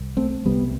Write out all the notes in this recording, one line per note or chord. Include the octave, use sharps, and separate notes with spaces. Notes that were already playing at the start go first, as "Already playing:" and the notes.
Already playing: C2
A3 C4
C2 C3 G3 B3